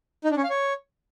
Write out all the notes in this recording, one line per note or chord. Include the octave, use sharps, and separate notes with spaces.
D#4
D4
C#4
F5
C#5